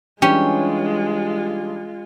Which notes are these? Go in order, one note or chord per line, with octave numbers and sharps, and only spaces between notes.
E3 G3 G#3 C#4 D4 F4 G4